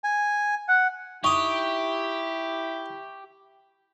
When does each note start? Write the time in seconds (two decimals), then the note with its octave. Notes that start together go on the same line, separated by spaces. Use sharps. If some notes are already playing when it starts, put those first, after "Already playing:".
0.04 G#5
0.68 F#5
1.24 D#4 E4 G4 C#6 D#6